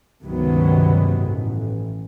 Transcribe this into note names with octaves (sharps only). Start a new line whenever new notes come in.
C#2 G2 C3 D#3 F#3 B3
A1